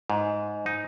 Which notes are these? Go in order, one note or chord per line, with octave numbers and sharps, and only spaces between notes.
G#2
D#4